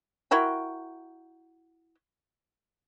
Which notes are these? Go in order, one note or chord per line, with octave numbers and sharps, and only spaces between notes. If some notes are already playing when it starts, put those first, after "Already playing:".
E4 F#4 A#4 G5